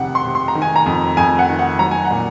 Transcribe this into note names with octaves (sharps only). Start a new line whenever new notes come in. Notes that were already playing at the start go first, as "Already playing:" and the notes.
Already playing: F2 C3 D#3 F#5
C6
C3
C6
A#5
D#3
G#5
A#5
F2
F2 G#5
F#5
D#3
F#5
F#3 A#5
G#5
F#5
A#2